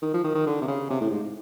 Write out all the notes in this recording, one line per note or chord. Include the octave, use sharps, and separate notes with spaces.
D#3
F3
D#3
D#3
D3
C3
C#3
C3
A2
G#2